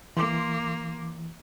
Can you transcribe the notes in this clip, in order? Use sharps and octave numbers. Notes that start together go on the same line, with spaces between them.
E3 A#3 C6 D6